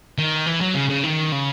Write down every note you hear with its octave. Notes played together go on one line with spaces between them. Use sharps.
D#3
E3
F#3
C#3
C#3
D#3
C#3